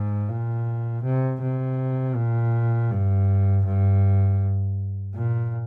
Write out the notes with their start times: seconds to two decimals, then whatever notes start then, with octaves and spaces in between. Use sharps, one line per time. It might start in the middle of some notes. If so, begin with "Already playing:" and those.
Already playing: G#2
0.29 A#2
1.03 C3
1.41 C3
2.16 A#2
2.90 G2
3.65 G2
5.14 A#2